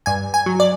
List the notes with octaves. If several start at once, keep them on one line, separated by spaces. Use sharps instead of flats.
G2 G#5
G#5
F#3
D5